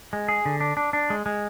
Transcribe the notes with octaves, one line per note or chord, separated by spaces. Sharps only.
G#3
G#4
D3
D4
D4
D4
G#3
G#3